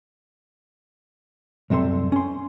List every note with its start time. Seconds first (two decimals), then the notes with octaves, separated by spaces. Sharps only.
1.70 C2 F#2 C3 A4 C6
2.12 C#4 C6